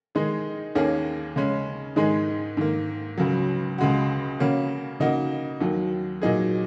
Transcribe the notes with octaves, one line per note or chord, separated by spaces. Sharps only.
D#3 G#3 D#4 G#4
D#2 D#3 A#3 C#4 G#4
C#3 G#3 C#4
G#2 D#3 G#3 D#4 G#4
G#2 D#3 A#3
C#2 C#3 F#3
C#2 C#3 G#3 F#4
C#3 A#3 C#4 F#4
C#3 A#3 D#4 F#4
D#2 D#3 F#3
A#2 F#3 D#4 G#4